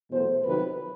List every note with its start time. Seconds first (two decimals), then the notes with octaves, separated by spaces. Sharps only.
0.11 E2 B2 F#3 A3 C5
0.43 F2 C3 D#3 F#3 B4